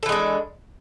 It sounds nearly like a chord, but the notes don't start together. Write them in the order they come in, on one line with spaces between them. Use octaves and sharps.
A4 E3 G#3 D4